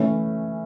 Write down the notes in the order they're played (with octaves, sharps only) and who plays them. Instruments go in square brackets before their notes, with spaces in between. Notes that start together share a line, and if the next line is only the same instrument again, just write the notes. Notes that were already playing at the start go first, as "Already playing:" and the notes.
Already playing: [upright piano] E3 A3 C#4